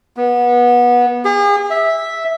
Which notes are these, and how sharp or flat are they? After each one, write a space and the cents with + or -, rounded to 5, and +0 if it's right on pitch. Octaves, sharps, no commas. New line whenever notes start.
B3 -25
G#4 -40
E5 -5